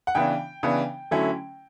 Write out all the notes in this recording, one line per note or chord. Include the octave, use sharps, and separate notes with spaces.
F#5
C#3 E3 B3 D4 G5
C#3 E3 B3 D4
D3 F#3 A3 C#4 E4